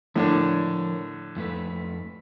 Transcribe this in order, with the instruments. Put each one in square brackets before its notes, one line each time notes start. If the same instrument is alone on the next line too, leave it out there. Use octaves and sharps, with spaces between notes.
[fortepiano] A2 D3 D4 [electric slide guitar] F3 A#4 C#5
[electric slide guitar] F2 A3 B4